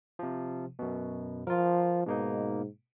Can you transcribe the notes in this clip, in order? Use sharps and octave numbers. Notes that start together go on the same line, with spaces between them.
C3 F3
F#2 B2
F3 F4 A#4
G#2 B2 A#3 D#4